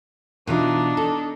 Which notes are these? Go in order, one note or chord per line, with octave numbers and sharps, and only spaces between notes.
B2 E3 D4 D#4 F4
A4